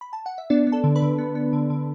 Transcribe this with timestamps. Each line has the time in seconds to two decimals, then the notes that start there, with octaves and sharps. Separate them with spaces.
0.01 B5
0.13 A5
0.26 F#5
0.38 E5
0.50 B3 D4 D5
0.67 B3
0.72 A4 A5
0.84 D3
0.95 B4 B5
1.02 D3
1.18 B3
1.35 B3
1.53 D3
1.70 D3